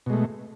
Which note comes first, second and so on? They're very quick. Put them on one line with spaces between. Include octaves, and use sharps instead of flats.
B2 G#3 A3